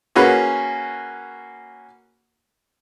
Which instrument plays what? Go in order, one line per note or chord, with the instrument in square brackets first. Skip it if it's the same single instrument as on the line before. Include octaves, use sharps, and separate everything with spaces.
[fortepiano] A#3 C#4 F#4 G#4 B4